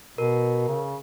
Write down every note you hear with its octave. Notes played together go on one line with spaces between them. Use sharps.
B2 A#4
C#3